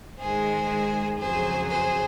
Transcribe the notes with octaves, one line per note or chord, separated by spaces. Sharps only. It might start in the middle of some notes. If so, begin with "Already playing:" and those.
G#2 D#3 G#3 G#4 C5
F2 C#3 F#3 G#4 C5
G#4 C5